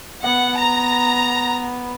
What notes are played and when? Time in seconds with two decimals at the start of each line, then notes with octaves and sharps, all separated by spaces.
0.24 B3 F#5
0.58 A#5